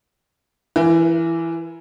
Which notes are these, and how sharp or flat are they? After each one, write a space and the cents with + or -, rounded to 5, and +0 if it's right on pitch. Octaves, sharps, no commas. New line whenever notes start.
E3 +10 E4 +35 A#4 +45